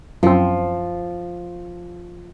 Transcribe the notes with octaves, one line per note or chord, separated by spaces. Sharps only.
F#2 F3 C4